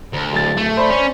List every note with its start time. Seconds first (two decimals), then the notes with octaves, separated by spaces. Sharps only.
0.13 D2
0.32 D1 A6
0.57 A3
0.77 C5 D5 B5
0.91 C#4